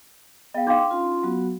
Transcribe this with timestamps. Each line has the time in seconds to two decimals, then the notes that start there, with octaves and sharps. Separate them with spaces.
0.54 B3 G#4 D#5 F5 G5
0.67 D4 D#4 F5 G5 C6 D6
0.90 C#4 F4 C6
1.23 F#3 B3 F#4